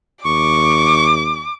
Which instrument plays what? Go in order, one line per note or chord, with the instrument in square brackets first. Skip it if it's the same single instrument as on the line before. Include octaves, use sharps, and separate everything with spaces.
[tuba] D#2 [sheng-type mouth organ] C#6 [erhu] D6